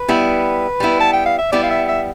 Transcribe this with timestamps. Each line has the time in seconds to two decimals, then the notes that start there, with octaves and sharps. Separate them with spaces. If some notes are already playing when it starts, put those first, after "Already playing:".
Already playing: B4
0.08 G3 B3 E4
0.80 G3 B3 E4
1.00 A5
1.13 G5
1.26 F5
1.39 E5
1.52 G3 B3 E4 D5
1.63 F5
1.70 E5
1.88 E5